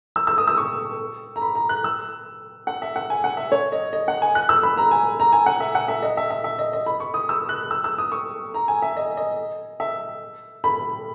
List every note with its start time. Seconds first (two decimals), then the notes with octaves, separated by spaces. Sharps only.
0.16 E6
0.27 E6
0.38 D#6
0.47 E6
0.58 C#6
1.36 A#5
1.42 B5
1.55 A#5
1.69 F#6
1.84 E6
2.67 F#5
2.82 E5
2.96 F#5
3.10 G#5
3.24 F#5
3.37 E5
3.52 C#5
3.72 D#5
3.93 D#5
4.08 F#5
4.22 G#5
4.35 F#6
4.49 E6
4.63 B5
4.77 A#5
4.91 G#5
5.20 A#5
5.32 G#5
5.46 F#5
5.60 E5
5.75 F#5
5.88 E5
6.03 D#5
6.17 E5
6.30 E5
6.44 E5
6.59 D#5
6.73 D#5
6.86 B5
7.00 C#6
7.14 D#6
7.29 E6
7.49 F#6
7.71 E6
7.84 E6
7.98 D#6
8.12 C#6
8.54 A#5
8.68 G#5
8.82 E5
8.97 D#5
9.17 D#5
9.80 E5
10.64 B5